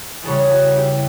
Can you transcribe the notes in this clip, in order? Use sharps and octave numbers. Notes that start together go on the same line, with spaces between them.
E2 C#3 E3 G3 A4 C#5
F#4 A4
E4 G4